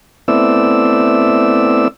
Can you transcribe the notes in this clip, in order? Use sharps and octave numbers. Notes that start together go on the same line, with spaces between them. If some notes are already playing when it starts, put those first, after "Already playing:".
A3 B3 C4 E4 D5 E6